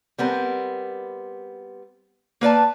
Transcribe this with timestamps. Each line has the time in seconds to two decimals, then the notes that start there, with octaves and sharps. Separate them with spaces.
0.18 G3 B3 C4 A#4
2.41 A#3 B4 D5 A5